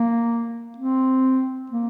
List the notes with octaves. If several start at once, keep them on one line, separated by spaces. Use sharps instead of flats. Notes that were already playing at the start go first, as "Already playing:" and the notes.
Already playing: A#3
C4
A#3